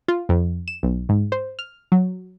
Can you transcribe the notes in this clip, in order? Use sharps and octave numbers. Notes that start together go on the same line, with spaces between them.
F4
F2
E7
B1
G#2
C5
F6
F#3